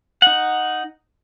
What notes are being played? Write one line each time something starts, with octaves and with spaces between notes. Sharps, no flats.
D#4 F#5